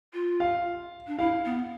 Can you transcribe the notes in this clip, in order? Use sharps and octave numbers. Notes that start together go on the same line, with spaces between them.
F4
F5
D4
E4 F5
B3